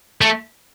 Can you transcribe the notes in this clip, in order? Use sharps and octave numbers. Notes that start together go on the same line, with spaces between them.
A3